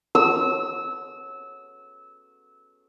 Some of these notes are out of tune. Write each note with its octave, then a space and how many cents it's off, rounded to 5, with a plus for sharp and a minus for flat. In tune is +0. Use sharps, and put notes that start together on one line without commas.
E6 -20